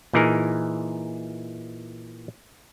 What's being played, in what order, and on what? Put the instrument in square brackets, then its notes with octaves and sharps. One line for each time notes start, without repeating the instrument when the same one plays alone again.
[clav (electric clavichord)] A#2 E3 D#4 G#4 A#4